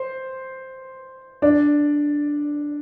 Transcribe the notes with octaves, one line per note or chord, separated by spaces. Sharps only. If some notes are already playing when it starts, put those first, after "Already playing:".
Already playing: C5
D4 D5